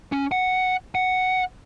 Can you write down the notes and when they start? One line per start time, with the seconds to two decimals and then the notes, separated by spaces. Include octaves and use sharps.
0.12 C#4
0.32 F#5
0.95 F#5